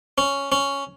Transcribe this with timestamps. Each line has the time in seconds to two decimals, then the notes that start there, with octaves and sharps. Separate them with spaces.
0.18 C#4
0.52 C#4